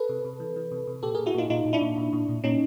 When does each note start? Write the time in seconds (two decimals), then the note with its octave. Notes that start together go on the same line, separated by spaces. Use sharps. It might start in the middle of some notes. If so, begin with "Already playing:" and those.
Already playing: A4 B4
0.09 C3
0.25 C3
0.40 E3
0.56 E3
0.71 C3
0.87 C3
1.03 A#2 G4 A4
1.14 A#2 G#4 A#4
1.26 E4 F#4
1.34 A#2 D#4 F4
1.50 A#2 D#4 F4
1.65 A#2
1.73 D4 E4
1.81 A#2
1.98 A#2
2.13 A#2
2.29 A#2
2.44 A#2 C#4 D#4